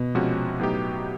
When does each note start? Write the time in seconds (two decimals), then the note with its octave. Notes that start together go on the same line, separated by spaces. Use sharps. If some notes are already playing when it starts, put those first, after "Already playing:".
Already playing: B2
0.15 C3 F3 G#3 C#4 F#4
0.60 A2 F#3 B3 D#4 G4